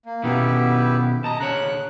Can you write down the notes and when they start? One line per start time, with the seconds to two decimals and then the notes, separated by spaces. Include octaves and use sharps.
0.06 A#3
0.24 B2 D#3 B3 E4 G4
1.24 D#5 A5 A#5
1.40 D3 C#5 F#6